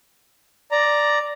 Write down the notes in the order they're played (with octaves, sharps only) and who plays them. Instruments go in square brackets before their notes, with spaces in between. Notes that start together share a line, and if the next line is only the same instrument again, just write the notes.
[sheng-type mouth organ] D5 A#5